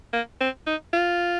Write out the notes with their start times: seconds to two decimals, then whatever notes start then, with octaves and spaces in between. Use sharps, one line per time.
0.13 A#3
0.41 C4
0.67 D#4
0.93 F4